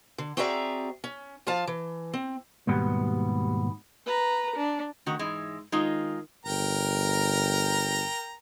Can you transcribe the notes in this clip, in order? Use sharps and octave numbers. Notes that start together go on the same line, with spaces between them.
D3
C4 F#4 G#4 D5 E5 A#5
C#4
F3 F4 F5 A5
E3
C4
D#2 G#2 B2 G3 B3
B4 A#5
D4
D2 D#3 F#4
G#2 E3 G#3
D#3 G#3 D#4 F4
G1 A#4 G5 A#5